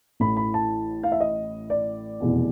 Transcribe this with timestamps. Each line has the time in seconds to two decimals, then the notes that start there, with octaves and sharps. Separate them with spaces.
0.20 A1 A2 E3 B5
0.37 B5
0.54 A5
1.03 F5
1.12 E5
1.20 D#5
1.70 D5
2.20 F1 E2 B2